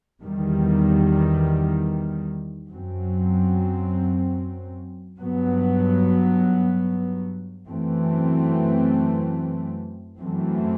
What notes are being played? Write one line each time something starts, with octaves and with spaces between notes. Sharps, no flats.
E2 D#3 G3
F#2 F#3 C4
G2 F#3 B3
F#2 E3 A3 C4
F#2 E3 A3 C4